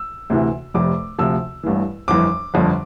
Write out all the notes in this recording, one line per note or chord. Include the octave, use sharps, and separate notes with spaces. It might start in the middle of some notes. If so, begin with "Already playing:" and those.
Already playing: E6
D2 C3 E3
F1 F2 C3 D6
D2 C3 F3 E6
A1 G2 E3
G1 F2 E3 D6
G1 F2 D3 F3